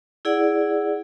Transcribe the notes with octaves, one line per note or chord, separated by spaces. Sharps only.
E4 G#4 D5 F#5